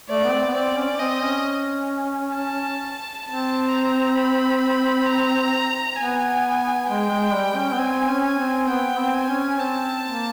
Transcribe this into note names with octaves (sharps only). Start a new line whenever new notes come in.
A3 D5
B3
C4
B3
C4 D5
C#4
C#4
C4 D#5
C#4
A5
C4 A5
A#5
B5
A#5
B3 G#5
G#3 G5
G#3
G3
C#4
B3
C4 G#5
C#4
G#5
C4
B3 G5
C4
G#5
C#4
C4 A5
A#3